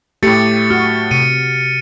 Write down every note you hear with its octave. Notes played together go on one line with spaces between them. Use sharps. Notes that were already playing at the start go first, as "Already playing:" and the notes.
A2 A3 G4 A6 C#7
F#4 F6
C3 C#7 D#7